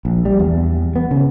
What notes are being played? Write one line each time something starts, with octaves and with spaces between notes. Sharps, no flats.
A#1
G3
E2
B3
C#3